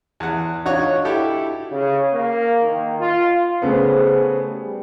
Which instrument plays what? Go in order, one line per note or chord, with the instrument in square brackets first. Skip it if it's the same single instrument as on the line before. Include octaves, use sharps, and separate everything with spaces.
[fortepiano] E2 F#5
[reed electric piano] D4 D#4 F#4 [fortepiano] F4 C#5 F#5
[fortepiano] E4 G4 A4
[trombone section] C#3
A#3
D#3
F4
[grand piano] C#3 A3 B3 [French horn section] G#4 C5
[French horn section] G3